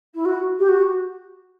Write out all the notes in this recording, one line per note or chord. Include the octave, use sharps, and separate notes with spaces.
E4
F#4
G4
F#4